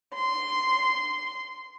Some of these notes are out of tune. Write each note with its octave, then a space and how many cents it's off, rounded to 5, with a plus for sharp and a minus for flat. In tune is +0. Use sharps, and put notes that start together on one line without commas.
C6 -10